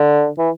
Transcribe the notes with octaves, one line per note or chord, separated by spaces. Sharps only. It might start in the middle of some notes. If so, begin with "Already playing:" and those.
Already playing: D3
E3